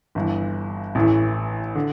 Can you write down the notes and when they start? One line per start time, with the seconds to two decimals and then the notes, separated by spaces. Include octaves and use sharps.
0.15 G1 G2 E3
0.95 A1 A2 E3
1.75 D3